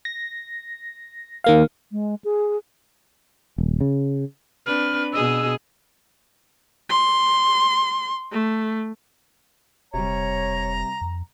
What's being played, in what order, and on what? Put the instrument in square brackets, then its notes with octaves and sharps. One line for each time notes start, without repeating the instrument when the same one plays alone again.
[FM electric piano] A#6
D#3 A#3 F5
[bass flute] G#3
G#4
[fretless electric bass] D#1
C#3
[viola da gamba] C4 D4 B4 [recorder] F6
[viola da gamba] B2 G#4 D#5 [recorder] E6
[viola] C6
A3
[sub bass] E1 [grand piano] C3 G3 [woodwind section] C#5 [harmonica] A#5
[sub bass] F2